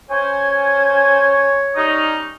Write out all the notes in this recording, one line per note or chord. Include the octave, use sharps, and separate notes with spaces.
C#4 C5 C#5 G#5
G3 C#4 D#4